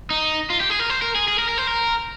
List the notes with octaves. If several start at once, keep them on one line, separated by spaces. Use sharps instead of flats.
D#4
F4
G4
G#4
A#4
C5
A#4
G#4
G#4
A#4
A#4
C5
A#4